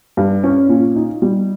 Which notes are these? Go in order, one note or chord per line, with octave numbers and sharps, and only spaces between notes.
G2
C#4
A#2
D#4
G3